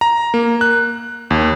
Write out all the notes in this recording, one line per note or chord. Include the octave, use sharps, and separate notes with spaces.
A#5
A#3
F#6
D#2